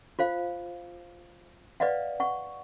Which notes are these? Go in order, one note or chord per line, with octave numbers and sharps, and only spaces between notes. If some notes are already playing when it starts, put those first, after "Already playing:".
F4 C5 F5
B4 D5 D#5 F5 F#5
F#5 C#6